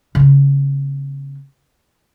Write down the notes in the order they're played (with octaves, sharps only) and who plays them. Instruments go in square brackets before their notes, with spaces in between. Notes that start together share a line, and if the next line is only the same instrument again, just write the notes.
[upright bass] C#3 B3